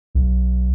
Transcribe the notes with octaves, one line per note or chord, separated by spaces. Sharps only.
B1